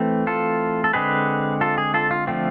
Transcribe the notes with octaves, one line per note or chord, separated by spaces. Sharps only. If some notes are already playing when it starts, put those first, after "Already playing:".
Already playing: E3 A3 C4
F4 A4
A4
D3 G#3 C4 G#4 B4
F4 A4
G#4
F4 A4
F4
D3 F3 A3 C4 F4